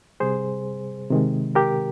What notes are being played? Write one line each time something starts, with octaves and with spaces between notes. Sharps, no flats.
C3 G3 G#4 C5
C3 D#3 G#3
G4 A#4